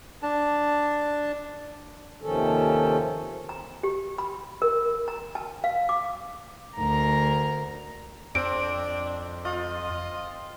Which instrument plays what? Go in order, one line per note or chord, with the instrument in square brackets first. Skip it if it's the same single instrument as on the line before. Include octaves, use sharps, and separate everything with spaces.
[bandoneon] D4 A5
[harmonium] D#2 C3 D#3 F3 C#4 A4
[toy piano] A#5
G4
B5
A#4
A#5
A5
F5
D6
[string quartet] D2 A#4 A#5
[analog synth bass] F2 [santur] C4 [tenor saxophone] D4 [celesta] D7
[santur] F4 [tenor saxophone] D#5